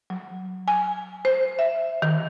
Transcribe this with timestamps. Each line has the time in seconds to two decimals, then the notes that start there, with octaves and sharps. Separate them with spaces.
0.10 F#3
0.68 G#5
1.25 C5
1.59 E5
2.02 D#3